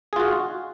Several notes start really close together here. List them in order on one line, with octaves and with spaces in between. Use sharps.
G#4 F4 F#4